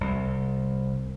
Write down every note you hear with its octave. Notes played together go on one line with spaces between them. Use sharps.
C2